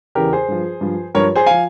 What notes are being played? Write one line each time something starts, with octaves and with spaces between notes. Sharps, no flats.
E2 C#3 E3 G4 A#4
G#4 C5
G2 F3
G2 F3
G2 F3 A#4 C#5
G#4 C5
F3 F5 G#5